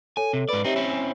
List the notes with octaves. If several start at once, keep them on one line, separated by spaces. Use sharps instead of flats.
A4 C#5 G#5
C3
G#2 B4 D5 B5
C4 D#4 G4 C#5 E5
C4 C#4 E4 G#5 E7